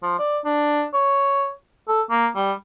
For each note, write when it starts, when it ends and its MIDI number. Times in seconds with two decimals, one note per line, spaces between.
0.03 0.17 53
0.19 0.39 74
0.44 0.84 62
0.93 1.51 73
1.88 2.02 69
2.10 2.28 58
2.36 2.52 55